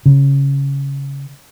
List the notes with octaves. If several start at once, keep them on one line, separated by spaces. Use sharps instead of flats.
C#3